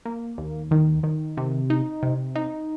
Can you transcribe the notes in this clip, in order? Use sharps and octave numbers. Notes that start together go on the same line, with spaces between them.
A#3
D#2
D#3
D#3
C3
D#4
C3
D#4